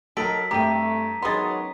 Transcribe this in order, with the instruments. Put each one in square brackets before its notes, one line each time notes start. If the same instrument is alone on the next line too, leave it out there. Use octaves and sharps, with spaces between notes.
[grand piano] F#3 A#4 [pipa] D#4 A4 [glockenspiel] B6 D7 F#7
[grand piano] G2 D6 [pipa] C3 G5 [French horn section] A3 [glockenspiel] A#5 D#7
[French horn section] D#3 F#3 C#4 [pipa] G#3 B3 [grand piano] C6 D#6 A6